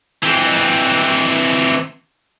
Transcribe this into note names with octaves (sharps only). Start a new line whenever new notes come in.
E3 C4